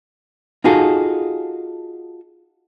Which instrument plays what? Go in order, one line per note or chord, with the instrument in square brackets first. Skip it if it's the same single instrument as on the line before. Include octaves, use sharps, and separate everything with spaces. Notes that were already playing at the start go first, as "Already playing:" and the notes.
[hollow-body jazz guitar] D#4 F4 F#4 G#4 A4